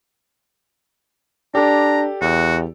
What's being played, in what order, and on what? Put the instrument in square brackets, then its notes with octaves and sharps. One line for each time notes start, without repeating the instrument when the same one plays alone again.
[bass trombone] D4 [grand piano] G4 A4 D5 [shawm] A#5
[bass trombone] E2 [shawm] F#4